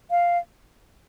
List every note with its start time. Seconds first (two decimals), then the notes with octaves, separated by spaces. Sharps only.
0.11 F5